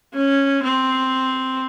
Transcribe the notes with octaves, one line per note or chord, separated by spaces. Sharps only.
C#4
C4